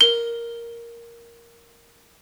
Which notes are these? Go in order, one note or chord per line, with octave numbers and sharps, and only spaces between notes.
A#4 G7